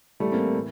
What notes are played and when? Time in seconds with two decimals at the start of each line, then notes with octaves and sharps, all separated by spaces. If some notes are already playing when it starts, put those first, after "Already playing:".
0.20 A2 E3 G3 A3
0.32 A#3 C4
0.54 A2 E3